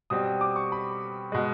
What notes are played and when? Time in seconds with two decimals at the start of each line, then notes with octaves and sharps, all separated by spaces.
0.10 B2 G3 C4 D#6
0.41 D6
0.56 C#6
0.72 B5
1.32 B2 G#3